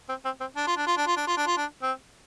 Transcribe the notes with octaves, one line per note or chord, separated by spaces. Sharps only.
C4
C4
C4
D4
F4
D4
F4
D4
F4
D4
F4
D4
F4
D4
C4